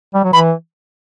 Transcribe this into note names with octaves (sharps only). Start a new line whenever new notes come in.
G3
F#3
E3 B5